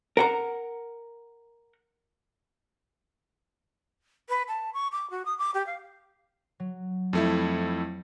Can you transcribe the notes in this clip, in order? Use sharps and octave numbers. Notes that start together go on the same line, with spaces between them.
A#4 F#5 A#5
B4
A5
C#6
D6
F#4
D#6
D6
G4
F5
F#3
F2 A3 E4